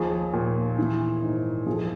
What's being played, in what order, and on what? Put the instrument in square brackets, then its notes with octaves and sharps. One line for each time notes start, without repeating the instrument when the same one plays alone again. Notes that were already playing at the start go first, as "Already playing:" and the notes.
Already playing: [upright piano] D#2 F3 G#4
A#2
E3
G#2
F3 G#4
A4